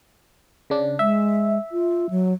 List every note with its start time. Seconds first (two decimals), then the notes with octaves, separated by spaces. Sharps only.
0.70 C#3 D4
0.99 G#3 E5
1.72 F4
2.10 F#3